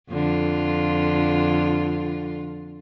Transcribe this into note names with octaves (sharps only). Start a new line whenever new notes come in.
F2 D3 F4